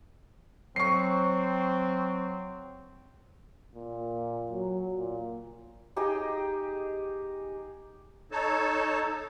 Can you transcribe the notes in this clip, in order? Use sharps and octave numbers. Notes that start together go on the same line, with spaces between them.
F#3 C4 C#6 C7
A#2
F#3
A#2
D#4 G4 G#4 D#5
D#4 A4 C#5 A5